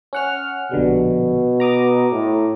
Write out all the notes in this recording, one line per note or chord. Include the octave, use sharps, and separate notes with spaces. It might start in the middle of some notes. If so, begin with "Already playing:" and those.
C#4 F#5 F6
A#1 B2 D3 G3
A#5 D6 D#6
A2